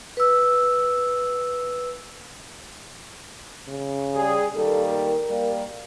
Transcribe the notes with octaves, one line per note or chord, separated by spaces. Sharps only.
B4 E6
C#3
G3 G#4
D#3 G3 A#3 A4
A#4
G3 A#3